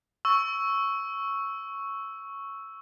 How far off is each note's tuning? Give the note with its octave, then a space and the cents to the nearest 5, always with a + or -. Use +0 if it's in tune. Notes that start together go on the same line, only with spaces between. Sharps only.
C#6 +0 E6 +0